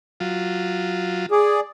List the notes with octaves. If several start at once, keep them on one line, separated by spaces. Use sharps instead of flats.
F#3 F4
G#4 D5